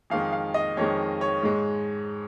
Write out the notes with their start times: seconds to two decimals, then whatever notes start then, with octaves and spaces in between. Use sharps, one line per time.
0.10 F2 D#3 G#3 F5
0.32 F5
0.54 D#5
0.77 F2 D#3 G#3 C#5
1.21 C#5
1.43 G#2 G#3